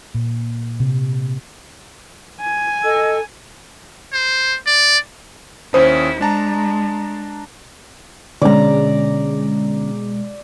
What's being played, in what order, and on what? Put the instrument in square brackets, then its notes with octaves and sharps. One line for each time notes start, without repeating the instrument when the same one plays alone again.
[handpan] A#2
C3
[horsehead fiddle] G#5
[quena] A4 [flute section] D#5 E6
[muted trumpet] C5
D5
[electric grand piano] D#2 C#4 D#6 [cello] E4 [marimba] C5
[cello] G#3 [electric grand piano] D4 A5 A#5
[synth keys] B2 G#3 [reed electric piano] D3 C#4 [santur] D5 A#5